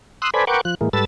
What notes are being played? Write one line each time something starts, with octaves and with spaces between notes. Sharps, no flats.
C6 D#6 E6 F#6
A4 B4 C5 D5 G#5 B5
A#4 B4 F#5 G5 C#6 D6
F3 F#6
A2 E3 G#3 A#3
G#2 G3 A4 B4 E6 A6